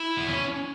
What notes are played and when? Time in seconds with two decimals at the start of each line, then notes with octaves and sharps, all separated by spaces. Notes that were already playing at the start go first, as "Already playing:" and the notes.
Already playing: E4
0.17 B3
0.28 C#4